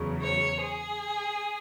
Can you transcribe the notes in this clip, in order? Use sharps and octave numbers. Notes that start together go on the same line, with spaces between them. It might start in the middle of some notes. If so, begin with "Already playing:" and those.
Already playing: E2 C#3 F#3
C#5
G#4